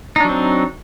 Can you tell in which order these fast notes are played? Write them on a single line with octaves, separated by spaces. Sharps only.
D#4 D4 F#3 C4